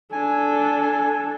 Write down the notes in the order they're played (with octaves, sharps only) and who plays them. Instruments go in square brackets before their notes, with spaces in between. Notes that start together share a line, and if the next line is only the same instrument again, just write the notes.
[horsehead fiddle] D4 A4 [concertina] G#5